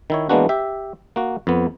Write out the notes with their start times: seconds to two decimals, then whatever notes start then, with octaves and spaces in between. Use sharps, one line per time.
0.10 D#3 E4 C#5
0.29 E3 G#3 A#3 B3 D4 F#4
0.49 G4 E5
1.16 A#3 F#4
1.47 F2 B3